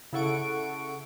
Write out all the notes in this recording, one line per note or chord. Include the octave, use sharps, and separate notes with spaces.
C#3 E4 A4 F#5 C#6 D7